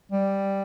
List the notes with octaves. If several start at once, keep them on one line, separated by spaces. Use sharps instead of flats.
G3